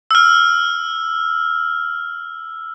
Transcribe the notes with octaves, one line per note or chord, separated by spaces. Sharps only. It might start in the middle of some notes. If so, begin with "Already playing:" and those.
E6 F6